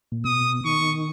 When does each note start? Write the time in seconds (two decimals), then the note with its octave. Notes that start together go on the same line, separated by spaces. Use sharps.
0.12 A#2
0.24 B2 D#6
0.65 D#3 C#6